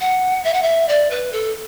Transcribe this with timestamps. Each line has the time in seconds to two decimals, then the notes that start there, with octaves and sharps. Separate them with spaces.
0.01 F#5
0.44 E5
0.54 F#5
0.62 E5
0.88 D5
1.11 B4
1.32 A4